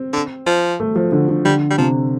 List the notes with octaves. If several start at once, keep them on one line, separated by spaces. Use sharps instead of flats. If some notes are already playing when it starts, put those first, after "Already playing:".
Already playing: C4
D3
F3
A3
F3
D3
D3
D3 G3
G3
C3 F3